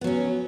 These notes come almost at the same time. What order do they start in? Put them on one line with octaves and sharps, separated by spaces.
B3 F#3 C#4